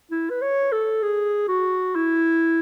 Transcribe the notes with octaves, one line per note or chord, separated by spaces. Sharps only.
E4
B4
C#5
A4
G#4
F#4
E4